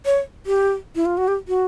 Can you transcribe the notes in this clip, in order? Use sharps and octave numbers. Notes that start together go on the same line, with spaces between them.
C#5
G4
E4
F4
F#4
G4
F#4